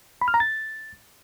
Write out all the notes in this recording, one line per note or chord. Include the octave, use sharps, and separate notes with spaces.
B5
F6
A#5
A6